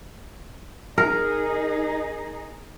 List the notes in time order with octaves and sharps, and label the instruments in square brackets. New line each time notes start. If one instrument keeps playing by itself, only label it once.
[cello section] D#4 G#4 [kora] A#4